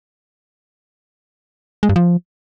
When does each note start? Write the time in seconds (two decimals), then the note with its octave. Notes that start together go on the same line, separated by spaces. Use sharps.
1.83 G#3
1.89 G2
1.96 F3